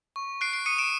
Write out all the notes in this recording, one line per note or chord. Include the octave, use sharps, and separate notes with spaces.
C#6
F#6 C7 D7
C7 D7
D#6 C#7 D#7
D7 E7